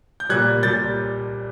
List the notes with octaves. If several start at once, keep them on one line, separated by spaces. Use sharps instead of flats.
G6
A#2 G3 F#6 G#6
A#2 G3 G6 A6